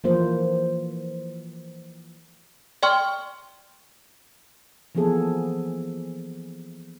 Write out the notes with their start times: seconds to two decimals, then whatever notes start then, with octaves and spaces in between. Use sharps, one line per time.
0.04 E3 F3 A#3 C5
2.83 D5 G5 C6 C#6 F6
4.95 E3 F3 A#3 B3 G#4 A4